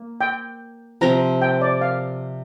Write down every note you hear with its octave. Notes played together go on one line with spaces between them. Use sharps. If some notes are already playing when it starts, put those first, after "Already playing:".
Already playing: A#3
G5
C3 F3 C4 A#5
G5
D5
F5